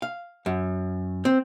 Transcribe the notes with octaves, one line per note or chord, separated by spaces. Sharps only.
F5
F#2
C4